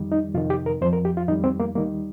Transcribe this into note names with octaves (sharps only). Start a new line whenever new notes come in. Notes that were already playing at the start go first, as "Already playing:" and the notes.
Already playing: F2 D#3 G3
D#4
F2 C3 D#3 F4
G4
A#4
F2 F3 C5
A#4
G4
F4
F2 D#3 G3 D#4
C4
A#3
D#2 D#3 G3 A#3